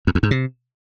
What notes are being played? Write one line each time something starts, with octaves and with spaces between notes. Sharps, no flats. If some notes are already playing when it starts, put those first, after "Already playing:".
F2
E2
G#2
C3